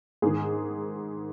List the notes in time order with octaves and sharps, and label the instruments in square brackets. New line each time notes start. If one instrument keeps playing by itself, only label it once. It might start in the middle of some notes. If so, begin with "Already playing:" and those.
[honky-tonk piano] G#2 D#3 G#4